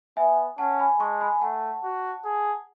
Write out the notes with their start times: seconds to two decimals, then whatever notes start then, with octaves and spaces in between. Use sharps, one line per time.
0.17 B3 E5 G#5
0.58 C#4 F#5 A5
0.79 G#5 B5
1.00 G#3 A5 C#6
1.21 G#5 B5
1.41 A3 F#5 A5
1.83 F#4
2.25 G#4